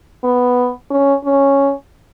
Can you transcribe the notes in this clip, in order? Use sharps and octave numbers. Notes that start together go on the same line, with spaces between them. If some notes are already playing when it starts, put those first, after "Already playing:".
B3
C#4
C#4